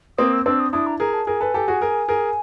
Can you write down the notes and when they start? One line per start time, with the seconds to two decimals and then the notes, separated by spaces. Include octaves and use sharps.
0.18 A#3 C4 D#6
0.33 E6
0.46 C4 D4 E6
0.60 D#6
0.72 D4 E4 D#6
0.87 A#5
1.00 G#4 A#4 A#5
1.14 A5
1.27 G#4 A#4 G#5
1.40 A4 B4
1.54 G4 A4
1.68 F#4 G#4
1.81 G#4 A#4
2.08 G#4 A#4